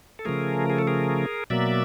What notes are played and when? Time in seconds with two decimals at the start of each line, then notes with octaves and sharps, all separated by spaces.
0.19 A4
0.25 C#3 F3 A3 G#4 A#4
0.70 G#4
0.79 A4
0.87 G#4 A#4
1.50 B2 F#3 A#3 D5 E5